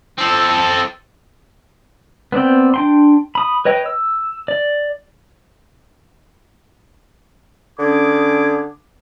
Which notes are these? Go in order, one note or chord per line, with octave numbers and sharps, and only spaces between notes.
C4 A4
B3 C4 D5 G5
D4 G5 C6
B5 D#6
B4 C#5 D#5 G5
E6
D5
D3 C#4 D6 D#6 G#6